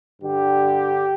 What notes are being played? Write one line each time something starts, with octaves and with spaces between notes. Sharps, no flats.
G2 D3 G4